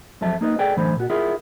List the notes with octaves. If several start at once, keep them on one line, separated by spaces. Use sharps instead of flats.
F2 F#3 A4 E5 A5
A#3 D#4 B4 D#5
G#4 A4 B4 D5 G5
F#2 A2 D3 E3 C5 B5
A#2 F#4
E4 F4 G#4 A#4